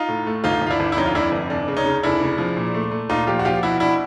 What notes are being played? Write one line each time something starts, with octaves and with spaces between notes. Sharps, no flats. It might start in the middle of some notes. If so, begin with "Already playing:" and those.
Already playing: D#4 F4
A2
A3
G1 D#4 F4
G1 F4
D4 E4
G1
E4
F2 C#4 D#4
F4
F2 D4 E4
G1
F1 D4
C#3
C#4 D#4
C#3
F1 D4 E4
C#3
F3
A#2
A3
A3
A#2 D#4 F4
F3 F4 G4
F#4
F3 F4 G4
B2 E4 F#4
B2 D4 E4